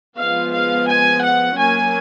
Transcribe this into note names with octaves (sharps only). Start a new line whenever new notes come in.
F3 G#3 B3 F5
F5
G#5
F#5
F#3 A#3 C#4 G#5